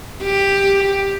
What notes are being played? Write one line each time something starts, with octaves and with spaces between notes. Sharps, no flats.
G4